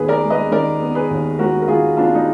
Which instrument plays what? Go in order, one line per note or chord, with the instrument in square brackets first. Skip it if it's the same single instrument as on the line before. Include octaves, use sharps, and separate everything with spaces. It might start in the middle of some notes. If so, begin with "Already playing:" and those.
Already playing: [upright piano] D#2 B3 G#4 B4
A#4 D5
G#3
B4 D#5
D#3 A#4 D5
B3
G#4 B4
D#2
G#3 F#4 A#4
A#4
D#3 F4 G#4
B3 D4 F4
D#4